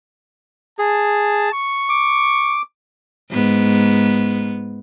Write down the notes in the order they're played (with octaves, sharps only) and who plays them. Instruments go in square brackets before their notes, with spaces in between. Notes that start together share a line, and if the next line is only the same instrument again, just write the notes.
[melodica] G#4 [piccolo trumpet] A5
[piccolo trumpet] C#6
[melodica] D6
[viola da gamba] G#2 B3